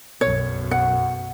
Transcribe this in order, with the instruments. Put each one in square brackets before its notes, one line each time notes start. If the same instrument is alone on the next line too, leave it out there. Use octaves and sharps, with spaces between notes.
[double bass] B1 F#2 [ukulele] C#5
[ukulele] F#5